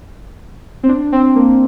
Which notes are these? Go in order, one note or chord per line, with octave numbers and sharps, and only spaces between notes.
C4
D4
C4
A#3